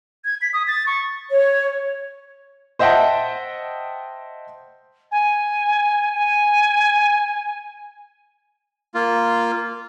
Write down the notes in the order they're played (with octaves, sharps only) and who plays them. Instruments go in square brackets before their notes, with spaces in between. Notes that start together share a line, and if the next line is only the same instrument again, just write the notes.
[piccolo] G#6
B6
D#6
A6
C#6
[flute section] C#5
[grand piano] C5 D#5 E5 F#5 G5 A5
[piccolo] G#5
G#5
[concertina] A#3 F4